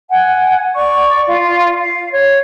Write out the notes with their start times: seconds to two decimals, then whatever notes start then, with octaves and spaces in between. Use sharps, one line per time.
0.09 F#5 G#5
0.75 D5 C#6
1.27 F4
1.79 F5
2.12 C#5